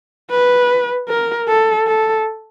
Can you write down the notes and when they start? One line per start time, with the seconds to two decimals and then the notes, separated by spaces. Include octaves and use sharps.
0.31 B4
1.09 A#4
1.48 A4
1.87 A4